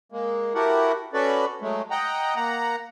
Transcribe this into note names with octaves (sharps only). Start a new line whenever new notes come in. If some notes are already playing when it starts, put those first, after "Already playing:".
G#3 A#3
E4 F#4 G4 A4 A#4 F#5
C#4 F#4 A4 B4 D5
F#3 G#3 A3
D#5 F#5 G5 A#5
A#3 F#5 A#5